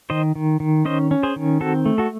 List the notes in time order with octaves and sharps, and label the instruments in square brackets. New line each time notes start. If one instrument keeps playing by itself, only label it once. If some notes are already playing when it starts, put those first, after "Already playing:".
[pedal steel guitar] D#3 C5 D#5
D#3
D#3
C#4 C5 D#5
C#4
G#4 C5
D#3
C4 F#4 A4
A3
F#4 A4